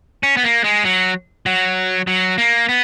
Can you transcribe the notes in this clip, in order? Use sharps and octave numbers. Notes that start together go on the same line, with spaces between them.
C#4
B3
A#3
G#3
F#3
F#3
F#3
A#3
B3